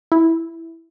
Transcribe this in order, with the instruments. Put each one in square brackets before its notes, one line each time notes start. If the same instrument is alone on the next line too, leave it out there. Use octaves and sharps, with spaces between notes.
[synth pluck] E4